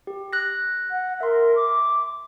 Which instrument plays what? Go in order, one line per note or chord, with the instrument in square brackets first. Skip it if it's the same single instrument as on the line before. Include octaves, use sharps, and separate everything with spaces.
[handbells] G4
F#6 A#6
[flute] F#5
[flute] A#4 [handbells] E5 C6
[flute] D6